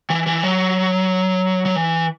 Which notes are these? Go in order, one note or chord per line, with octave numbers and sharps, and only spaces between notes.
E3
E3
F#3
F#3
E3